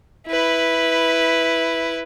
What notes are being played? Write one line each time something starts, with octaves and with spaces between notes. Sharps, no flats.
E4 B4